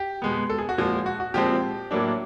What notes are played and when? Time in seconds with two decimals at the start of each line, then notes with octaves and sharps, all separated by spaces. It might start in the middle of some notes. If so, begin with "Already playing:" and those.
Already playing: G4
0.22 B2 G#3 B3
0.50 A4
0.59 G#4
0.69 F#4
0.78 A#2 F3 G#3
1.06 F#4
1.20 F#4
1.34 A#2 F3 G#3 C4 G4
1.91 A2 F#3 A#3 D4